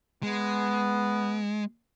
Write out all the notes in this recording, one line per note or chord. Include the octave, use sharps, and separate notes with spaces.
G#3 B3